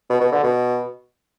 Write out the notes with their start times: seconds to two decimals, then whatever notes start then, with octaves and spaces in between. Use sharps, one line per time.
0.10 B2
0.21 B2
0.32 D3
0.43 B2